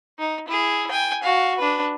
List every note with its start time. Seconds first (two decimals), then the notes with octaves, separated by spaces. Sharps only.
0.19 D#4
0.48 E4 G#4
0.91 G5 G#5
1.23 F#4 F5
1.58 D4 B4